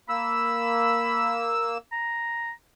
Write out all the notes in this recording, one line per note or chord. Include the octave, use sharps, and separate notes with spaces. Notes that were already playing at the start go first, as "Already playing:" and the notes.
A#3 B5 E6
A#5